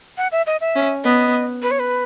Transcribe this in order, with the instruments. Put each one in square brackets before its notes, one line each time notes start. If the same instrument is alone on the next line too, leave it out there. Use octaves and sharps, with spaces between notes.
[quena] F#5
E5
D#5
E5
[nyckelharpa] C#4
[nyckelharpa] B3 [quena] D#5
[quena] B4
C#5
B4